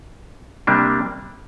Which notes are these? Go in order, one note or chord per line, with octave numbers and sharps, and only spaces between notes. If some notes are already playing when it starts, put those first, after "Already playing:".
C3 G3 A#3 D4